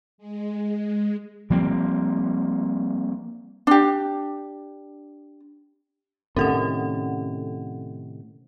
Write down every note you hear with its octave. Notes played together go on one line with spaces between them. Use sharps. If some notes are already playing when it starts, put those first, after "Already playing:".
G#3
F3 G3 A#3 C4
D4 G4
A2 C3 D#3 C#4 A4 F#5